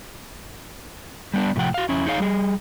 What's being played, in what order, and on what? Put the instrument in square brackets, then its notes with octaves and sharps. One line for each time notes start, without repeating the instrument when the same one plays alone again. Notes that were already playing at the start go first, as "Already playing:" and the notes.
[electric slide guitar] G3 B3 D4
A2 C3 F3 F#5 G5
F#4 F5
F2 C#4 E4
D#4 G#4 C#5 F5
G3 G#4